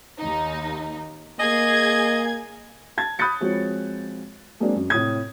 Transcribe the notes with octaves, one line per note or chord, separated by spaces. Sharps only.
D#2 D#4
A#3 G#4 D#5 G#6
A5 G#6 A6
B5 D#6 F#6 G6 A6 C#7
F3 G#3 C4 F#4 C#5
F#3 G#3 A#3 C4 D4
F#2
A2 C3 C#5 D#6 G#6